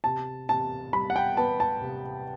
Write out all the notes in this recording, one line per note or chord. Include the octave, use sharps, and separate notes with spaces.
C3 A5
C3 A5
G3 B5
F#5
G5
B3 A5
A5
C3